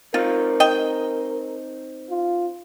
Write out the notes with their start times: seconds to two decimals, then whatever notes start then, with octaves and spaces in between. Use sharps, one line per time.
0.14 C4 D#4 F4 A#4
0.60 D#5 G5
2.10 F4